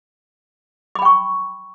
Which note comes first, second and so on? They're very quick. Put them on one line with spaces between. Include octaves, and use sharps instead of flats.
D6 B5 G5 C#6